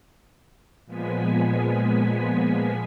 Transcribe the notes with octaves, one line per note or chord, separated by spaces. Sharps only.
A#2 F3 G#3 B3 G#5 B6